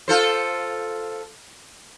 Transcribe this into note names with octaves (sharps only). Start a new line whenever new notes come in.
F4 A4 C5